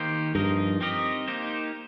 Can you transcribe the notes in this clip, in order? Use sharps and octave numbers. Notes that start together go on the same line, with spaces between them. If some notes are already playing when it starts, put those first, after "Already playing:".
Already playing: D#3 A#3 D#4 G4 C5
G2 F3 D#4 A#4 D#5
C4 D#4 G4 A#4 D#5
A#3 D#4 G4 C5